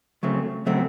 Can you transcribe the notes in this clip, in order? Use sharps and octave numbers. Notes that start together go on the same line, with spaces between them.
C#3 F#3 A3 C4
C#3 F#3 A3 C4